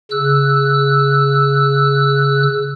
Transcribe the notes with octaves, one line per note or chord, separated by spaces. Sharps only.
C#3 E6 F#6